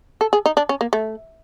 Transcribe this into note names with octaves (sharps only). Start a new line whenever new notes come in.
A4
G#4
D#4
D4
C#4
A#3
A3